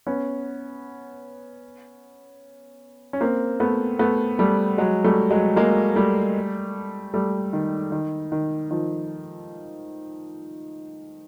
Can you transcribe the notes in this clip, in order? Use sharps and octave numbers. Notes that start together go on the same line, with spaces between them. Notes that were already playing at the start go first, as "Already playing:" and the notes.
B3 C#4
C#4
A#3 C4
A3 B3
A3 B3
G3 A3
F#3 G#3
G3 A3
F#3 G#3
G#3 A#3
G3 A3
G3 A3
D#3
D#3
D#3
D#3 F3